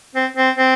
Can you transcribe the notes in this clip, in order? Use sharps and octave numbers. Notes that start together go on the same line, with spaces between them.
C4
C4
C4